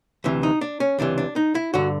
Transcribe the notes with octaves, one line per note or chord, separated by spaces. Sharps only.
D2 C3 E3
D#4
D4
C#4
C#2 C3 E3 D4
D4
D#4
E4
G2 D3 F#4